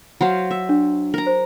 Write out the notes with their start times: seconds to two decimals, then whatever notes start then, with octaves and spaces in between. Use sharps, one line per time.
0.21 F#3 C5 F5
0.51 E5
0.69 D4
1.14 A#4 A#5
1.27 C5